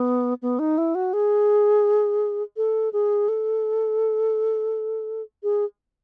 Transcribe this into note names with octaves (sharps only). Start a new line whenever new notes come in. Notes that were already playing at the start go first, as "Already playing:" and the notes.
Already playing: B3
B3
D#4
E4
F#4
G#4
A4
G#4
A4
G#4